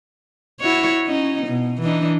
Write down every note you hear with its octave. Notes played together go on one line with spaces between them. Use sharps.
E4 F#4 C#5
C#4 D#4
B2
E3 D4 D#4